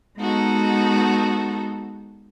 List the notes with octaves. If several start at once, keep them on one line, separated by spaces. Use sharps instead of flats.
G#3 B3 D#4 F#4 A4